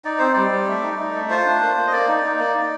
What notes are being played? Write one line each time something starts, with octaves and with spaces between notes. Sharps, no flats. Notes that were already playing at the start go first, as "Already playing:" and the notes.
D#4 D5
C4 C5
G3 D5
G3
A3
D#4
D#4
A3
F4 C5
D4
A#3
A#3
D#5
A#3 D5
D#4
D#4
A#3
D#4